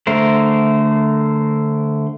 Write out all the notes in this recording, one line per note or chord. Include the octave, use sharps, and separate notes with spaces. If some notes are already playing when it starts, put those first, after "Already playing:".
D3 A3 A#4 C5